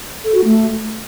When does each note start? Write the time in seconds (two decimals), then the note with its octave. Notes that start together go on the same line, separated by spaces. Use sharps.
0.24 A4
0.34 F#4
0.44 A3